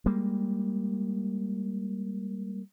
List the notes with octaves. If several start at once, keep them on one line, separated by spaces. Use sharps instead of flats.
G3 G#3 A#3